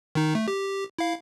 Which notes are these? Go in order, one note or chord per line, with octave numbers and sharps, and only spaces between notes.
D#3 D#4
A3
G4
E4 F5